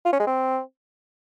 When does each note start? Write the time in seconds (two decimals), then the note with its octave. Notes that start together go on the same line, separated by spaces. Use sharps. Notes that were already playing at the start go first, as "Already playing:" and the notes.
0.06 F4
0.13 C#4
0.20 G#3
0.27 C4